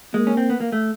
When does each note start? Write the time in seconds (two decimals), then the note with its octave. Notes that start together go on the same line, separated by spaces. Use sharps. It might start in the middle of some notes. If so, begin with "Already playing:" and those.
0.14 G#3 A#3
0.27 C#4
0.37 C4
0.50 B3
0.60 A#3
0.72 A3